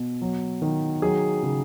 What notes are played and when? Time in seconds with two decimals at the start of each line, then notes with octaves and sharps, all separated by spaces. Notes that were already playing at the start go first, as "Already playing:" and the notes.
Already playing: B2
0.21 F#3
0.62 D#3
1.02 F#3 G#4
1.43 C#3